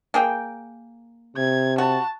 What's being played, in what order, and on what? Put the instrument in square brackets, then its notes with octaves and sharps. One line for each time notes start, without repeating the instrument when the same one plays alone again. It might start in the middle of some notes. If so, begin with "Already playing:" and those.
[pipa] A#3 G#4 G5
[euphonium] C3 [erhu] G#6
[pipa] F#4 [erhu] A5